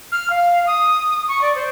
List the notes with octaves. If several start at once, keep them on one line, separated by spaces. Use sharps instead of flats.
F6
F5
D#6
C#6
D5
C5